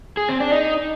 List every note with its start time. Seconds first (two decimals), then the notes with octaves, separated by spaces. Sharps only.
0.17 G#4
0.29 C4
0.40 D4
0.52 D#4